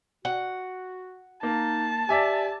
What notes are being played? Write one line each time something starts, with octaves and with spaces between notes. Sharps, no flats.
F#4 F#5
A#3 D#4 A5
G4 D5 E5 G#5